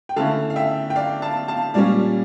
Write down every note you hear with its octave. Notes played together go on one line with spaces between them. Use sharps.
G5
D3 A3 C#4 E4 F5 A5
F5
E5 G5
G5
D5 F5
F5 A5
F5 A5
A#2 G3 C#4 D5 F5